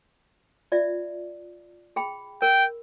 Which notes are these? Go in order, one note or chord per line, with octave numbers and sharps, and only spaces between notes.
F4 D5 E5
G#4 G5 B5
A#4 G5